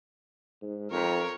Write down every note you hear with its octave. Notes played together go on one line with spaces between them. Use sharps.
G#2
F2 A#4 C#5